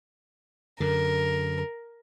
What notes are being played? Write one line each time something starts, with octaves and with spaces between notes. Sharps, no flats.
F#2 D3 A#4